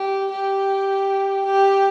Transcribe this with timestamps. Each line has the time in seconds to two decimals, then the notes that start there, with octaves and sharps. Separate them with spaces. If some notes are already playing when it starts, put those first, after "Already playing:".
Already playing: G4
0.31 G4
1.46 G4